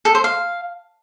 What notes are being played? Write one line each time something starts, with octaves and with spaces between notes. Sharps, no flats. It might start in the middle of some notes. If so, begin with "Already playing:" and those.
A4
C5
F5